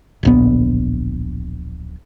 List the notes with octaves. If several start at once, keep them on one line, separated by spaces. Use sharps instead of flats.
D1 A#1 B3